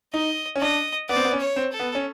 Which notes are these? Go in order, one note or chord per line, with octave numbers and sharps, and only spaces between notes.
D#4 D#5
C#4
D4 D#5
B3 D5
C4
B3
C#4
C#5
C4
A4
B3
C#4